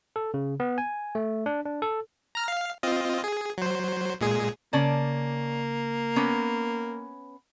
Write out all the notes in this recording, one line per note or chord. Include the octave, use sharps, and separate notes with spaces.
A4
C#3
B3
G#5
A3
D4
D4
A4
A#5 F6
F5
C4 F4 D#5
G#4
F#3 C5
A#2 G#3 G#4
C#3 A#3 C#4 D5 A5 D6
B3 C#4 A#5 D6 F6